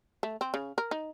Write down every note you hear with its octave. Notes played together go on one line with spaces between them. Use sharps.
A3
C4
C#3
A#4
D#4